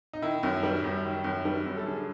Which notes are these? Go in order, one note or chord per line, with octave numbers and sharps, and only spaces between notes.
D#4
D#3 E4
F#2
G3
F#2
D#3
F#2
G3
F#2
A4
D3 G#4